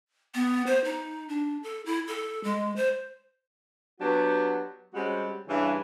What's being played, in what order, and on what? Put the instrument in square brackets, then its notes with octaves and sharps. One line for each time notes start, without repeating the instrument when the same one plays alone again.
[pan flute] B3
C5
D#4
D4
A4
E4
A4
G#3
C5
[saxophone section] F#3 B3 D4 F#4 G4
G3 G#3 C4 C#4 F#4
G2 C#3 E3